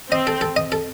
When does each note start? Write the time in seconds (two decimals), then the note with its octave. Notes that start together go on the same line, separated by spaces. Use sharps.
0.11 C4 D#5
0.27 A4
0.41 A4
0.56 D#5
0.72 A4